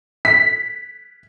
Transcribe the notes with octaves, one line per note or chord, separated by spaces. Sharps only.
B6